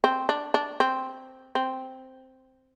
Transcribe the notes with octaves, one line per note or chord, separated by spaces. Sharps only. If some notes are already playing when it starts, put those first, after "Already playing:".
C4
D4
D4
C4
C4